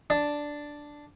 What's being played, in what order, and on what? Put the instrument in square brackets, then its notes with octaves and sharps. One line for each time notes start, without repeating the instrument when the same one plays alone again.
[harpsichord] D4